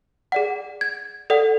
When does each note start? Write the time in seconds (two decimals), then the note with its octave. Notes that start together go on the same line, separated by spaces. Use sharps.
0.32 G#4 D5 F#5
0.81 G#6
1.30 A4 D5 F#5